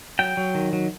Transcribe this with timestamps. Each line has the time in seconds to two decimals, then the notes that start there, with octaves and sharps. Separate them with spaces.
0.19 F#3 G5
0.37 F#3
0.55 D#3
0.73 F#3